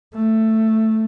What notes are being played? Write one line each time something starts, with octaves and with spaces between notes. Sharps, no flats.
A3